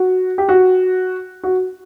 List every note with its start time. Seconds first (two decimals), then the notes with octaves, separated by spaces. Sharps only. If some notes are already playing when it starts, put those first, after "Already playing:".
Already playing: F#4
0.38 G4
0.49 F#4
1.43 F#4